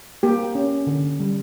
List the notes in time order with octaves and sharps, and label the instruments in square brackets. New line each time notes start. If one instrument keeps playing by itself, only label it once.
[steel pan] A#3 G4
C#4
D3
G3